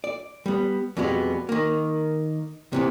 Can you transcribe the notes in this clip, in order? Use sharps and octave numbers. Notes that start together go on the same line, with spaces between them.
D5
G3 B3
F2 B2 G3 G#3 B3
D#3 A#3
C3 E3 B3